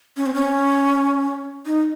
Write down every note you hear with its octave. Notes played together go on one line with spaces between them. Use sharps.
C#4
C4
C#4
D#4